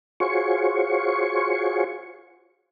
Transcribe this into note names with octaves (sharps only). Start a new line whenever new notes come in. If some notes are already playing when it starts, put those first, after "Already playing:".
F4 F#4 G#4 C5 C#5 C#6